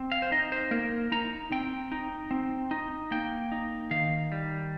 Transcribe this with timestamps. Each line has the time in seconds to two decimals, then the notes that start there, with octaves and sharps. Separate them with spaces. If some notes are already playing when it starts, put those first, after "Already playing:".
Already playing: C4
0.12 F5
0.22 C5
0.32 D#4 D#5
0.52 C5
0.71 A#3 A#4
1.12 D#4 A#5
1.52 C4 G5
1.92 D#4
2.31 C4
2.71 D#4
3.11 A#3 G5
3.52 D#4
3.91 D#3 F5
4.32 G3